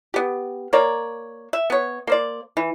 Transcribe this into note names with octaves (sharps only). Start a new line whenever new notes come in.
B3 G4
A#3 A#4 C#5 D5
E5
B3 C#5
A#3 C5 D5
E3